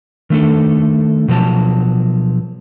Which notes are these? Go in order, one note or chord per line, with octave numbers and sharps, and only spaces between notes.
D#3 A3 D4 A4
B2 F3 F#3 A5